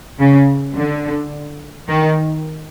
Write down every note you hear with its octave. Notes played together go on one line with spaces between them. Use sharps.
C#3
D3
D#3